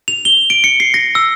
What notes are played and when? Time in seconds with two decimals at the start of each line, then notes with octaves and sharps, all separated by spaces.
0.08 F7
0.25 G7
0.50 D7
0.64 C#7
0.80 C7
0.94 A#6
1.15 E6